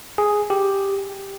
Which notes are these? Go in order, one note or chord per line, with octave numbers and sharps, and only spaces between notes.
G#4
G4